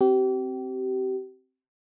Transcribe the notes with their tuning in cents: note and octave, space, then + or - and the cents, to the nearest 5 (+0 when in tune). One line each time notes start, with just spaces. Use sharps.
C4 +0 G4 -35